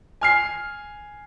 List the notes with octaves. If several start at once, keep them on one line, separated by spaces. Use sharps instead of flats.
G#5 F6 C7